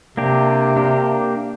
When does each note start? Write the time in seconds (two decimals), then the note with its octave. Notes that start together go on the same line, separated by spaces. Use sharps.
0.17 C3 A#3 D4 G4
0.76 A#3 D4 G4